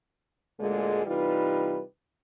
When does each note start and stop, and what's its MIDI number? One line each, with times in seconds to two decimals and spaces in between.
0.60 1.02 38
0.60 1.02 46
0.60 1.02 50
0.60 1.02 56
1.06 1.80 48
1.06 1.80 52
1.06 1.80 55
1.06 1.80 63
1.06 1.80 65
1.06 1.80 71